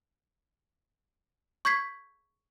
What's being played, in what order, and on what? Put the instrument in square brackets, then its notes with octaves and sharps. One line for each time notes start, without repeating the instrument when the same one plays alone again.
[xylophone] C#6 G6 G#6 B6 C7